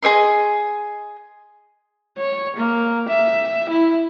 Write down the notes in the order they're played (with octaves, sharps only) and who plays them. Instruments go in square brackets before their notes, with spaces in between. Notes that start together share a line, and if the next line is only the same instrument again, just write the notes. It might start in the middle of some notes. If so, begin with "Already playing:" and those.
[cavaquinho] G#4 C#5 D#5 C6
[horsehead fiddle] C#5
A#3
E5
E4